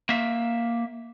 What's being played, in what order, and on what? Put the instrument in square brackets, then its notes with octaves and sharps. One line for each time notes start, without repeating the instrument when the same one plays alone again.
[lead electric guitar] A#3 E5